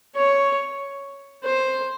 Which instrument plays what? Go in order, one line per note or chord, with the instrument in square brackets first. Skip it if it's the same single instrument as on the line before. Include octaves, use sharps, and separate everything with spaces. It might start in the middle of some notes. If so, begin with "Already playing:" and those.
[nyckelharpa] C#5
C5